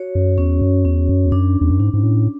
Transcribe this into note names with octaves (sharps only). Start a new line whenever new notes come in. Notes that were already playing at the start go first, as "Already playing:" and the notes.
Already playing: F#4 C#5
F#2
E2 C#4
F#2
E2 C#4
F#2
E2
F#2 D4
E2
F#2
G#2 D4
G#2
A2